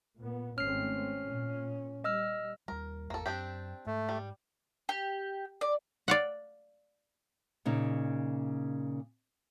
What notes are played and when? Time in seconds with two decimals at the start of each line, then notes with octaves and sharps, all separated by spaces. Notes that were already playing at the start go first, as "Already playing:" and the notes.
0.18 A#2 B3
0.58 G#1 A3 C4 C#4 F6 C7
1.24 A#2
2.04 G3 D#5 E6 F6
2.68 D#2 G3 A#4
3.10 G#1 E2 A#3 A4
3.26 F#2 C4 D4 G4
3.86 G#2 A3
4.09 G3
4.89 G4
5.61 D5
6.08 D5 F5 F#5
7.65 A#2 C#3 D#4